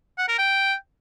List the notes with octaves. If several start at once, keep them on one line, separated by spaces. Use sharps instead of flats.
F#5
A#4
G5